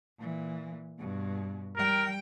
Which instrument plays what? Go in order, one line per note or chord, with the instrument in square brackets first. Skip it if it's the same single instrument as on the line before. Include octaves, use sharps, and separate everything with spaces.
[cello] A#2 E3
G2 B2
[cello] G3 G5 [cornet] A#4